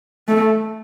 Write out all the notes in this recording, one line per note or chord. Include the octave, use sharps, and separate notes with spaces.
A3